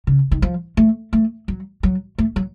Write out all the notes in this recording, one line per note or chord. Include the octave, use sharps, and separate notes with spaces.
C#3
D#3
F3
A3
A3
F#3
F#3
A3
F#3